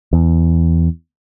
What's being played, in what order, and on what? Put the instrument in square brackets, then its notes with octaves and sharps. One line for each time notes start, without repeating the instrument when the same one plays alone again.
[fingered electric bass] E2